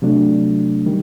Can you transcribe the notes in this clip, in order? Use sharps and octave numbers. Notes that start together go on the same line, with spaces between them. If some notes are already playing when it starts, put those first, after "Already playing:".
C3 F#3 A3 D4
D#3 G3